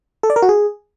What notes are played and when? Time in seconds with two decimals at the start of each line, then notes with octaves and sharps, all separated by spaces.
0.23 A4
0.30 D5
0.36 A#4
0.42 F#4
0.49 G#4